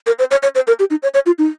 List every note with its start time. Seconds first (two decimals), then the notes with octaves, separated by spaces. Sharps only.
0.07 A#4
0.19 C5
0.31 C#5
0.43 C#5
0.55 C5
0.67 A#4
0.79 G4
0.90 D#4
1.03 C#5
1.14 C#5
1.26 F4
1.38 D#4